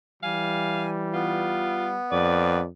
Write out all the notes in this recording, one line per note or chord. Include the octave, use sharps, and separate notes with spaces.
E3 G3 F5 G#5
B3 F4
F2 B4 D5